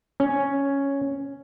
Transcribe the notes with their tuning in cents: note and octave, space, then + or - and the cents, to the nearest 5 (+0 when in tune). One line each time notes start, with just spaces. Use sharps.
C#4 +0